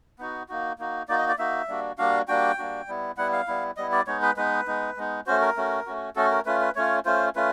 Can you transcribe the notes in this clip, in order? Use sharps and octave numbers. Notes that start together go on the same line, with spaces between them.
B3 D#4 F#4
A#3 D#4 F#4
A#3 D#4 F#4
A#3 D#4 F#4 D5
D#5
D5
A#3 D#4 F#4 E5
G3 A#3 D4 F#4
G3 A#3 D4 F#4 F5
G3 A#3 D4 F#4 G5
G3 A#3 D4 F#4
G3 B3 E4
G3 B3 E4 F#5
F5
G3 B3 E4
G3 B3 E4 D#5
D5
G#3 B3 D#4 C#5
B4
G#3 B3 D#4 B4
G#3 B3 D#4
G#3 B3 D#4
A3 C#4 F#4 C5
A#4
A3 C#4 F#4
A3 C#4 F#4
A3 C#4 F#4 A4
A#4
A3 C#4 F4 B4
B4
A3 C#4 F4 C#5
A3 C#4 F4 C5
A3 C#4 F4 B4